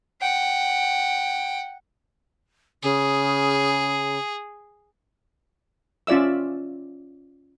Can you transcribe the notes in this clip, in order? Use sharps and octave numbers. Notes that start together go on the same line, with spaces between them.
F#5 G5
C#3 G#4
C#4 F4 D5 E5 E6